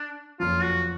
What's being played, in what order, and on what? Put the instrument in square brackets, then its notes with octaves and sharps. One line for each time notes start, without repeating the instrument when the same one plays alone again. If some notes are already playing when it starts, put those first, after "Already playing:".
Already playing: [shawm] D4
[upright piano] F#1 F2 F3 [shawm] F4
[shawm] F#4